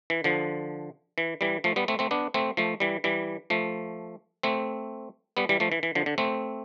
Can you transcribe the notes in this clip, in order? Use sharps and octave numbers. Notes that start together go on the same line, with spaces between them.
E3
D3 F3
E3
E3 G3
F3 A3
G3 B3
A3 C4
A3 C4
B3 D4
A3 C4
F3 A3
E3 G3
E3 G3
F3 A3
A3 C4
G3 B3
E3 G3
F3 A3
E3
E3
D3 F3
D3
A3 C4